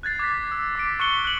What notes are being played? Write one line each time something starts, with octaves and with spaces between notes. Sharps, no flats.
F#6 G#6 A6 C7
D6 F#6 B6
E6
D6 B6 D7
C#6 F#6 C#7 G7
F#6 F#7